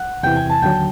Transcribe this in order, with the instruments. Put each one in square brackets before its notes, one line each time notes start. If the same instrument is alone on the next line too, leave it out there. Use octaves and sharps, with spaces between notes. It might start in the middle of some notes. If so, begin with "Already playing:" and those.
Already playing: [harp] F#5
[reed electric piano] E2 C3 E3 [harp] G5
[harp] G#5
A5
[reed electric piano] D#2 D3 F#3 [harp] G5